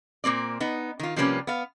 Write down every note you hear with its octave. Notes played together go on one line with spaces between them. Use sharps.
A#2 A#3 C4 D5
B3 D#4
D#3 F4
C3 F3 G3 A#3 C#4 B4
B3 F5